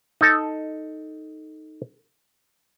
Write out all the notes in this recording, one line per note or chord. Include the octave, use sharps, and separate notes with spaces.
D#4 A4